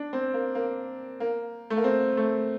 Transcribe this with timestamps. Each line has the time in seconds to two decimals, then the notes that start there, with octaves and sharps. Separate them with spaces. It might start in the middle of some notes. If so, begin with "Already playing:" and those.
Already playing: D4
0.13 C4
0.34 A#3
0.55 A#3
1.20 A#3
1.70 A3
1.77 A#3
1.84 C4
2.17 A3